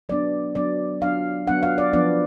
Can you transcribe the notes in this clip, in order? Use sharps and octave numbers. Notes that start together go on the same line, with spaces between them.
F#3 B3 D4 D5
F#3 B3 D4 D5
F#3 B3 D4 F5
F#3 B3 D4 F#5
F5
D5
F3 B3 D4 D5